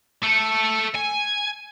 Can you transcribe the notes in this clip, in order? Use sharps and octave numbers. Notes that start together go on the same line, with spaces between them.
A3 A4
G#5